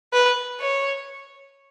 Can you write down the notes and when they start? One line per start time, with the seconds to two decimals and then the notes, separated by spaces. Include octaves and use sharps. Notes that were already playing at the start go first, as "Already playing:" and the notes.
0.13 B4
0.61 C#5